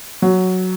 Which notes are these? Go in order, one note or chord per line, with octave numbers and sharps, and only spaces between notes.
F#3